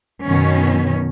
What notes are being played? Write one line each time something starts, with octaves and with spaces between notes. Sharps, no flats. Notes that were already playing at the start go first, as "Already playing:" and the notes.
F#2 B2 D#3 C#4